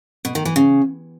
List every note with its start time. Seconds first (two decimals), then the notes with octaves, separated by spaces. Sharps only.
0.25 B2
0.35 D#3
0.45 E3
0.56 C#3